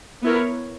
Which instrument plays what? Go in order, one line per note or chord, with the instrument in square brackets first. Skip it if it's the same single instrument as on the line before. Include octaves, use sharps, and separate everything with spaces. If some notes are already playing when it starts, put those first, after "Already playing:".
[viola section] B3 E4 A#4 C#5